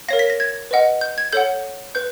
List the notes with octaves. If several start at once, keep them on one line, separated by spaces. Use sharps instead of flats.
A#4 C#5 F5 A#6
B6
A#6
G#6
B4 D#5 F#5
G6
G#6
A4 C#5 F#5 G6
B4 G6